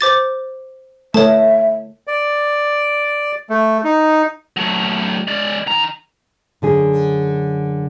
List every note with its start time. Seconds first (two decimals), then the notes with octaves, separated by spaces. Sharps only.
0.01 C5 D6 A6
1.14 A3 C#5 E5 A5
2.07 D5
3.50 A3
3.84 D#4
4.57 F#3 A3
5.27 G#3 D5
5.67 D#3 A#5
6.62 F#2 D3 G#4